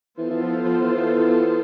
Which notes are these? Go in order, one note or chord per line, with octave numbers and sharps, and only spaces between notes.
E3 B3 F4 A4 C5
E3
F3
F3
E3
E3